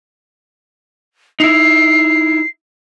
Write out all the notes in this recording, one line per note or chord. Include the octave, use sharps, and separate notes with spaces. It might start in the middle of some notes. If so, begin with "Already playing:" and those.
D#4 E4 C7